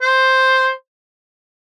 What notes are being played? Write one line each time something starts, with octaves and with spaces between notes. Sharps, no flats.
C5